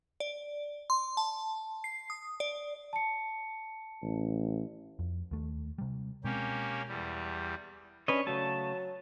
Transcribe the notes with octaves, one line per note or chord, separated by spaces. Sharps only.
D5
C6
A5
C7
D#6
D5
A5 C#7
A1
F2
D#2 A3
C3 G3
B2 G#3 A#3 C4 C#4 G4
E2 G3
C#4 D4 B4 C#5 D#5
C#3 F#3 A3 A5